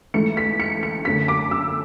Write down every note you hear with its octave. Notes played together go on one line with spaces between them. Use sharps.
G#2 E3 A3 C#7
B6
C#7
C#7
F#2 D3 A3 B6
D6
E6